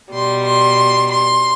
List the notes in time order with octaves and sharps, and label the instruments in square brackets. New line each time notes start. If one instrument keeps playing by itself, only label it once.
[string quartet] B2 G3 C6
C6
C6